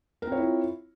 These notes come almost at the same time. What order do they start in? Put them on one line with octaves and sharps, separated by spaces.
A#4 C4 C#5 E4 F4